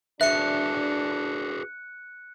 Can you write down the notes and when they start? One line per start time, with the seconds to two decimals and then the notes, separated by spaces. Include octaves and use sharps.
0.21 D4 F#4 G#4 B4 E5 F#6 C#7